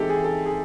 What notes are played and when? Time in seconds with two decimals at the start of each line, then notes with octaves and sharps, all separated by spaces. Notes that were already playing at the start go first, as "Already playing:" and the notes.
Already playing: E3 G#3 C4 D#4 G4 A4
0.09 G#4
0.24 A4
0.46 G#4